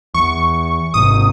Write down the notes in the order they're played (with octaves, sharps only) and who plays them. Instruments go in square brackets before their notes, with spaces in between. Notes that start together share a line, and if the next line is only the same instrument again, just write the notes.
[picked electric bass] E2 [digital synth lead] C#6
[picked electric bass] G#1 G#2 C3 [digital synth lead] D#6